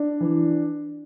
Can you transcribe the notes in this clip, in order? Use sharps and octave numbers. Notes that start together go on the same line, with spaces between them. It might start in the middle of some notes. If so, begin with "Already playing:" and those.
Already playing: D4
E3